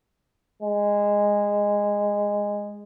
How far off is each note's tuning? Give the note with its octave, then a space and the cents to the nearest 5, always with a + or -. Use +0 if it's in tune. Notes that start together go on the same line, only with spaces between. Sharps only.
G#3 -15